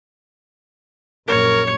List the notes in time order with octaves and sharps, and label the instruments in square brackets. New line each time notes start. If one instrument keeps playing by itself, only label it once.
[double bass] A#1 F#2 [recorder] A#4 [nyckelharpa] C#5